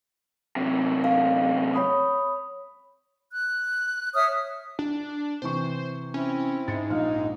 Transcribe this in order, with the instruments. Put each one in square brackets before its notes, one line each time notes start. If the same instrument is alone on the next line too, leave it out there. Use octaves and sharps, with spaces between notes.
[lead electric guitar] F#2 C3
[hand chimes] F5
C#5 B5 D#6
[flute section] F#6
C#5 E5 D#6 F6
[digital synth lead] D4
[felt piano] C3 E3 C#6 [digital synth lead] C5
[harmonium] C4 E4 [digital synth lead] C#4
[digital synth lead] G#2 [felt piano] A6 C#7
[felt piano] A#1 F5 F6 [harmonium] D#4